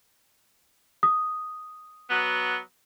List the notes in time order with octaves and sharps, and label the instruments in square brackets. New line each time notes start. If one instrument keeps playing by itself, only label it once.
[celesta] D#6
[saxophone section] F#3 B3